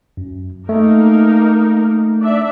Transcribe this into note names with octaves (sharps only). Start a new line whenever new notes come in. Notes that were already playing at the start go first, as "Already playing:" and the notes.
F#2
A3 A#3 D#4 A#4
D4 D5 E5